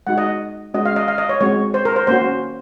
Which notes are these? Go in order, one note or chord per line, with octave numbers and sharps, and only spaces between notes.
G#3 D#4 F#4 F#5
D#5
G#3 C#4 F#4 D#5
F5
D#5
F5
D#5
C#5
G#3 C4 F#4 C#5
C5
A#4
C5
A#3 C#4 F#4 C5